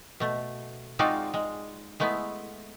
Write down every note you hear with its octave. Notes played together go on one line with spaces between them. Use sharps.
B2 A3
G#3 C4 D#4 F4 F#4 D5
G#3
G#3 A3 B3 E4